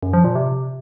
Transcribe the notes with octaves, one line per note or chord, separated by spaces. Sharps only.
F#2
F3
A#2
C3